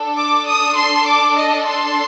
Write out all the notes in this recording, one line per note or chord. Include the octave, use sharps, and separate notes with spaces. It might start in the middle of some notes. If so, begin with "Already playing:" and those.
Already playing: D4 A4
D6
D#6
C6
D6
D#5
C6